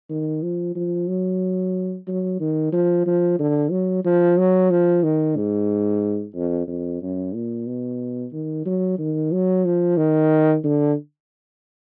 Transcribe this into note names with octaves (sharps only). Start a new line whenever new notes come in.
D#3
F3
F3
F#3
F#3
D#3
F3
F3
D3
F#3
F3
F#3
F3
D#3
G#2
F2
F2
F#2
A#2
B2
D#3
F#3
D#3
F#3
F3
D#3
D3